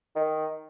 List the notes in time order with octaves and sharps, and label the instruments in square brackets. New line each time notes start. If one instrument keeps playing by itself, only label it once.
[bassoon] D#3